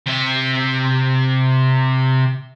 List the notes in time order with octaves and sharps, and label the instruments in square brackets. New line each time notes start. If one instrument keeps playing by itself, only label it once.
[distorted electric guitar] C3 E5